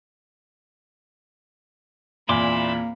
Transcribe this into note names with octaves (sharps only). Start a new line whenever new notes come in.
E2 A#2 A#3 C4 E4 B5 C6 D6